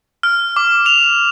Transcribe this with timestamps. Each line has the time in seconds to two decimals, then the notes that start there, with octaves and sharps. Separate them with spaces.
0.23 F6
0.56 D6
0.86 F7